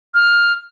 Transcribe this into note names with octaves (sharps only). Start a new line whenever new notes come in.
F6